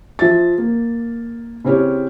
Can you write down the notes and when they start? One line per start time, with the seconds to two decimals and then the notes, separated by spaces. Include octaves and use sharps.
0.19 F3 E5 A6
0.58 A#3
1.65 C#3 C4 C#4 E4 G4 C#5